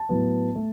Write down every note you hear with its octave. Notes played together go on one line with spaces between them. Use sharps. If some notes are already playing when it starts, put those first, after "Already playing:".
Already playing: A5
A2 F#3 B3
A3